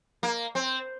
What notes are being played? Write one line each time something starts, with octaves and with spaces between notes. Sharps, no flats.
A#3
C4